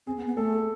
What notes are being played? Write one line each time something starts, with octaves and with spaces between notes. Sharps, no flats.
C4 G#4
B3
B3
A3 A4